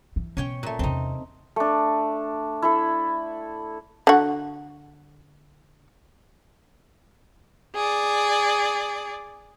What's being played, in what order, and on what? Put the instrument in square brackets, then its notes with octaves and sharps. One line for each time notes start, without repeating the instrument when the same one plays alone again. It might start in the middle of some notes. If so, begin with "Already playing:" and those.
[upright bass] E3
[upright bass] B2 [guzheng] C#4 C#5 G5
[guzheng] A#2 A3
[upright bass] E2 C3 [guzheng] C4 D#4
[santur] A3 D4
E4 A4
[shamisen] D3 F#4
[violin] G#4 D5